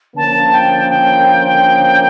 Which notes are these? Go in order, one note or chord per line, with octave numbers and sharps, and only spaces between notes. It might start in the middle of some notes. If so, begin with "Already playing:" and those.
D3 F3 A#3 C#4 A5
G5
G5